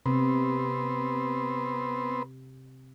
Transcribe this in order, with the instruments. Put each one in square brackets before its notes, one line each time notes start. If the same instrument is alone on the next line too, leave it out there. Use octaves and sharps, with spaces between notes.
[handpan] C3 [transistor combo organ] B3 C4